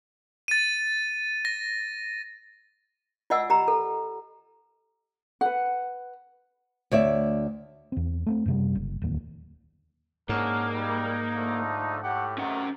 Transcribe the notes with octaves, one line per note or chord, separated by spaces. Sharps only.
A6 D#7
A#6
F4 D5 D#5 F#5 G#5 E6
G4 A#5 B5
A4
B4 F#5
D2 C#5 D5 E5
E2 C4
A3 B3 C4
F#2 C3 G3
F#1
D1 D#2
G#2 A#3 C#4 D4 A#4 F#5
G3 D#4
D3 F3 A3
A2 A3 G4 F#5
C3 D#3 A3 C#4 F#5